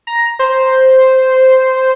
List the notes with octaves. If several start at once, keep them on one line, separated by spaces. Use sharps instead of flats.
A#5
C5